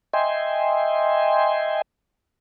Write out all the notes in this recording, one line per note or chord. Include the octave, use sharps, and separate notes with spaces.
D#5 E5 G5 G#5 C6